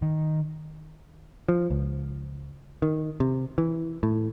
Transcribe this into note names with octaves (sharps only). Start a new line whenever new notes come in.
D#3
F3
C#2
D#3
C3
E3
A2